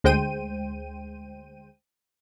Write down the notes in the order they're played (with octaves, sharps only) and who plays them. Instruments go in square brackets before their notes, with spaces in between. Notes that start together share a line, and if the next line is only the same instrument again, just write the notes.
[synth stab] D2 G#3 C5 G5 D#7